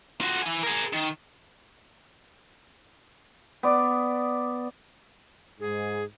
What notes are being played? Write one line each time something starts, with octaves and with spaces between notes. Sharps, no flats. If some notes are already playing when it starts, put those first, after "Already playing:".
F4 F#4
E4 G#5
G#4 A#4
D#3
B3 D5
G#2 G#4